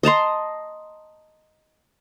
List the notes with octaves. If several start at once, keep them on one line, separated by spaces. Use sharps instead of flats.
D#5 A5 A#5 C6